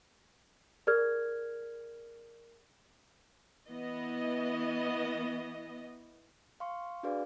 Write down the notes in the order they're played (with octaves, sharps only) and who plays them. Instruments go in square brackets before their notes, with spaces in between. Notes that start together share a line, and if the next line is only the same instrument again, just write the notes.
[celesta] G#4 A#4 D5 F6 G#6
[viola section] E3 B3 D#5
[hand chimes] F5 C6 C#6
D4 F#4 G#4 B4 D5 F5